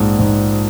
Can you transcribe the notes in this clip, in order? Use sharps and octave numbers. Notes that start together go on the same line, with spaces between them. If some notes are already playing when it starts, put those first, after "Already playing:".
Already playing: A#1 G#2
G#2